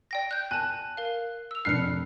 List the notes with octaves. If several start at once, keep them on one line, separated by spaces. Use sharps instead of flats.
D5 G5 A#6
F#6 G6
G#5 A5 F#6
A#4 F5
E6 F7
F1 D4 F6 F#6 C7 C#7